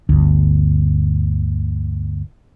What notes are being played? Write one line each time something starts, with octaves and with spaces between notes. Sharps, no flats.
G1 D2